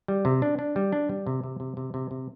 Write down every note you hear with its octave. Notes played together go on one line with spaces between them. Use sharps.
G3
C3
D4
D4
G3
D4
G3
C3
C3
C3
C3
C3
C3